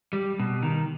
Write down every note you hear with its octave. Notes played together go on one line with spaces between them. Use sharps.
G3
B2
D#3